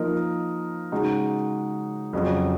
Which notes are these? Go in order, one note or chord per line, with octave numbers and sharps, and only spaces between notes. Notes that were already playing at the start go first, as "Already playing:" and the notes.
Already playing: F3 A#3 D#4 A#4 D#5
C#3 G#3 D#4 F#4
F2 C#3 F#3